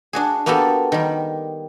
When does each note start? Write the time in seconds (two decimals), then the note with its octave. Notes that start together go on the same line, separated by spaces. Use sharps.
0.13 D4 F#4 G#4
0.46 A#3 B3 F#4 G4 A4
0.92 D#3 G3